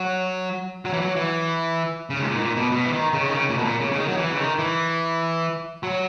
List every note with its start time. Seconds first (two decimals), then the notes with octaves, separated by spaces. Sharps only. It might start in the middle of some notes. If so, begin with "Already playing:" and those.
Already playing: F#3
0.85 F#3
0.93 E3
1.01 F#3
1.16 E3
2.10 C#3
2.20 G#2
2.25 A#2
2.36 G#2
2.41 A#2
2.57 B2
2.72 B2
2.86 E3
2.93 D#3
3.13 C#3
3.27 D#3
3.34 C#3
3.50 A#2
3.58 B2
3.65 A#2
3.80 C#3
3.92 C#3
3.96 D#3
4.08 F#3
4.17 E3
4.32 C#3
4.38 D#3
4.59 E3
5.83 F#3